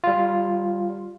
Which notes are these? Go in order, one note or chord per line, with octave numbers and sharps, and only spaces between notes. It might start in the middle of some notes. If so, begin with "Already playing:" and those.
G3 F4